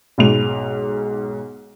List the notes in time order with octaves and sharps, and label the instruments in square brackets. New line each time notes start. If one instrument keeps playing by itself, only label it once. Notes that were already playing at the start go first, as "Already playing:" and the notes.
[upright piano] B1 G#2 F7